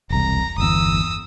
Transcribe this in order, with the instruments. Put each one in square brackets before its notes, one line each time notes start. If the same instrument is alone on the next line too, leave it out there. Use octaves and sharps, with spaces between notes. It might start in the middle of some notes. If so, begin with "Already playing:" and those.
[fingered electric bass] E1 C2 [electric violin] A#5
[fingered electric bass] G1 E2 [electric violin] D#6 E6